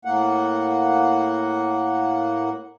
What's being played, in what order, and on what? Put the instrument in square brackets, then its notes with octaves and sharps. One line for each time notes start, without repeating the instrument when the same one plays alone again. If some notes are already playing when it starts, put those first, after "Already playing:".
[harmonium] A2 A#3 F#5